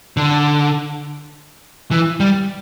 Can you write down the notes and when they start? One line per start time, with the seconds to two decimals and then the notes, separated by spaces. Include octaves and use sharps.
0.17 D3
1.91 E3
2.20 G3